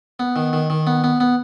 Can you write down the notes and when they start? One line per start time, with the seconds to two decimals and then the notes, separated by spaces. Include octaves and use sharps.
0.19 B3
0.36 D#3
0.53 D#3
0.70 D#3
0.87 B3
1.04 B3
1.20 B3